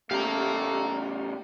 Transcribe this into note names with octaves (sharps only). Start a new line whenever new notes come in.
A2 C#3 A3 G4 F5 A#5